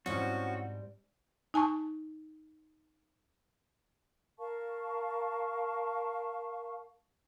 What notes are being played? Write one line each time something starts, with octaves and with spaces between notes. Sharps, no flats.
G#2 F3 G3 C4 C#4 E4 F#4
D#4 G#5 A5 C#6
A#4 F5 A5 C#6